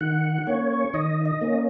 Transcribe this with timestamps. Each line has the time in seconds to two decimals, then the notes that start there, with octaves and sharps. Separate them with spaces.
0.01 D#3 F#5
0.47 A#3 C#4 C#5
0.94 D#3 D#5
1.26 D#5
1.41 A#3 C#4